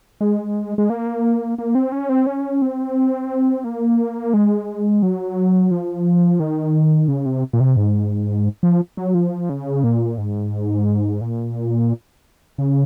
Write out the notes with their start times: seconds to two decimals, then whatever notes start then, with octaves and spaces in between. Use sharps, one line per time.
0.21 G#3
0.78 G#3
0.90 A#3
1.58 A#3
1.75 C4
1.92 C#4
2.09 C4
2.27 C#4
2.62 C4
3.64 A#3
4.34 G#3
5.02 F#3
5.71 F3
6.40 D#3
7.08 C#3
7.26 C3
7.53 A#2
7.60 C3
7.77 G#2
8.63 F3
8.97 F#3
9.14 F3
9.49 C#3
9.84 A#2
10.18 G#2
11.21 A#2
12.58 C#3